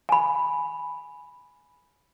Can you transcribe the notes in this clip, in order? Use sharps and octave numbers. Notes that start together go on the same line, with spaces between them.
G#5 B5